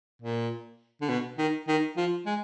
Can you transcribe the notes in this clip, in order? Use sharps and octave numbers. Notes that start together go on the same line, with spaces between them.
A#2
D3
B2
D#3
D#3
F3
G#3